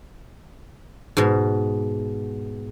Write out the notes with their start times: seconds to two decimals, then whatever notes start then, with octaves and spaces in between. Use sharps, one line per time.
1.17 G#2 B2